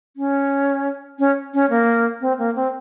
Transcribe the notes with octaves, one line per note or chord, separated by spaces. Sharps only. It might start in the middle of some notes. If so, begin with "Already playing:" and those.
C#4
C#4
C#4
A#3
C4
A#3
C4